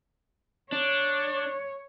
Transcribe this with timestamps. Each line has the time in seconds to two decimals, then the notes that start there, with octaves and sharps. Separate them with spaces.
0.72 D4 C#5